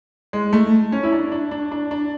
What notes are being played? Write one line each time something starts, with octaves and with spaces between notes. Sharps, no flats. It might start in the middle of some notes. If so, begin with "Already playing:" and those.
G#3
A3
C#4
E4
D4
D4
D4
D4
D4